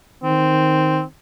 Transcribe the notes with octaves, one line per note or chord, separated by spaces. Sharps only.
D#3 C4